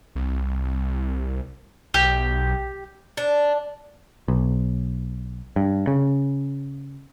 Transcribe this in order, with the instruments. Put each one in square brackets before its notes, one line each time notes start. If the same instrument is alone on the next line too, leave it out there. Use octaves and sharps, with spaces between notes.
[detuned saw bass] C2
[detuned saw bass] B1 [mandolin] G4
[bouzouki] D4
[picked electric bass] B1
G2
C#3